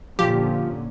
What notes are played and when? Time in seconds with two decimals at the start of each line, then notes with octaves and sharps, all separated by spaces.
0.19 A#2 D3 F3 C#4 G4